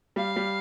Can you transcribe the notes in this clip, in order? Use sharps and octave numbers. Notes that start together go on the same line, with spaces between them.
G3 F5
G3